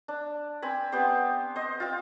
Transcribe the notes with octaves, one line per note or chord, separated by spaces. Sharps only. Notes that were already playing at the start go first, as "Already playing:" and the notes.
D4
C4 G#5 B5
B3 C4 G4 C5
C5 D#5
C4 F4